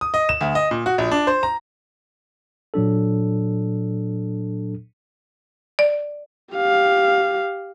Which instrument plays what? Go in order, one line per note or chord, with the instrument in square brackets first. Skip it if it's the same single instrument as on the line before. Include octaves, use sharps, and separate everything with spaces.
[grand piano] D#6
D#5
E7
D2
D#5
A#2
F#4
A#1
D4
C5
A#5
[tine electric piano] A#2 F#3 D4 A4
[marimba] D5
[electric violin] G4 F5